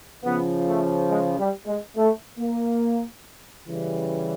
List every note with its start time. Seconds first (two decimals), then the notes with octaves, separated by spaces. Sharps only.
0.24 C#3 F3 B3
0.67 A3
1.10 G#3
1.39 G3
1.66 G#3
1.96 A3
2.38 A#3
3.66 C#3 E3 G3